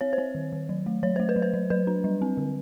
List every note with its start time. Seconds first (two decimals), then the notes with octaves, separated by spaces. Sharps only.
0.01 C4 C#5
0.13 C5
0.18 C4 C#5
0.35 D#3
0.53 D#3
0.69 F#3
0.86 A3
1.03 F#3 C#5
1.16 A3 C5
1.29 B4
1.36 F#3
1.42 C5
1.54 F#3
1.70 F#3 B4
1.87 D4
2.04 G3
2.22 C4
2.37 D3